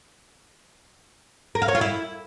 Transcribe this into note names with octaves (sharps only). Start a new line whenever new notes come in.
A#4
F5
C#5
F4
E4